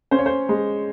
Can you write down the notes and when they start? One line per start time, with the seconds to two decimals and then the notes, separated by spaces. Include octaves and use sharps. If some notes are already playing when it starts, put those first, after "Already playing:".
0.11 C#4 C5
0.19 C#5
0.26 C5
0.49 G#3